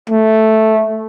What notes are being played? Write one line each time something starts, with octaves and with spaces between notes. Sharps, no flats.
A3